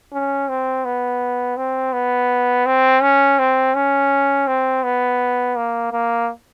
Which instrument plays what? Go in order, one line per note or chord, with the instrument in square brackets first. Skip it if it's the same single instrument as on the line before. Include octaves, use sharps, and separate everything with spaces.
[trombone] C#4
C4
B3
C4
B3
C4
C#4
C4
C#4
C4
B3
A#3
A#3